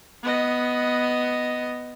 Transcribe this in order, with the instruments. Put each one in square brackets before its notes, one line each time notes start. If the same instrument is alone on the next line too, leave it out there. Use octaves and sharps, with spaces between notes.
[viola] B3 D#5